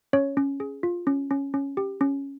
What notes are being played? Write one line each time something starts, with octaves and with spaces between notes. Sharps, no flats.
C#4 C#5
C#4
G#4
F4
C#4
C#4
C#4
G4
C#4